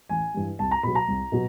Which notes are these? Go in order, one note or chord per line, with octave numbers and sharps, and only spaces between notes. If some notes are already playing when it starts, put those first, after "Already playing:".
A1 G#5
G2 E3 G3
C2 A5
A#5
B2 F#3 B5
A#5
C2
B2 F#3